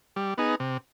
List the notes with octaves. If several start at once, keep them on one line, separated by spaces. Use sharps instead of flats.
G3
B3 D#4 G#4
C3